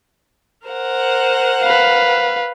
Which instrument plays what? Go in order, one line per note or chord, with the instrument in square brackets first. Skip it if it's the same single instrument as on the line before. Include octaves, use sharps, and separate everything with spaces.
[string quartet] A#4 C5 F#5
[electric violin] B4 F5